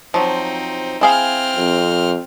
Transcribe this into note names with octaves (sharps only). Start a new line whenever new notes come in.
F3 F#3 C4 D#4
C4 E4 G#4 F5 F6
F2